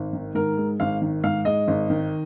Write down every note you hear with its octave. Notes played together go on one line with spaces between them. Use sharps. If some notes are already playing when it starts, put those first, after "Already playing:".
Already playing: G#1
D#3
G#2 A#4
G#3
G#1 F5
D#3
G#2 F5
G#3 D#5
G#1
D#3